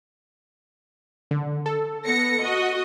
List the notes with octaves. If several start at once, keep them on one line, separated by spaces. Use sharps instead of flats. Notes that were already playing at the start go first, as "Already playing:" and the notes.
D3
A4
B3 A#6 C#7
F#4 D#5